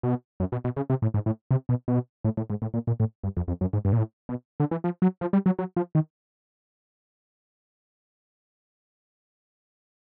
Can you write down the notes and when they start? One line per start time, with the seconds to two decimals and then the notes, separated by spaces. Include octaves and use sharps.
0.03 B2
0.40 F#2
0.52 B2
0.64 B2
0.77 C#3
0.90 C3
1.02 A2
1.14 G#2
1.26 A2
1.51 C3
1.69 B2
1.88 B2
2.24 A2
2.37 A2
2.50 G#2
2.62 A2
2.74 A#2
2.87 A#2
3.00 A2
3.23 G2
3.37 F2
3.48 F2
3.61 F#2
3.73 G#2
3.85 G2
3.93 A#2
3.98 A2
4.29 B2
4.60 D3
4.71 E3
4.84 F3
5.02 F#3
5.21 F3
5.33 G3
5.46 F#3
5.59 F#3
5.76 F3
5.95 D#3